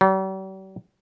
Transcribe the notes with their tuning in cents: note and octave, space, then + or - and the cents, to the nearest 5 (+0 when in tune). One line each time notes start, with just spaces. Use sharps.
G3 -45